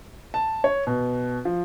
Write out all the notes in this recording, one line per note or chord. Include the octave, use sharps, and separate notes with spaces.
A5
C#5
B2
F3